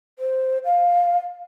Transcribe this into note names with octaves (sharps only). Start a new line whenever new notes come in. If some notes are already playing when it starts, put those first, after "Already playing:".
C5
F5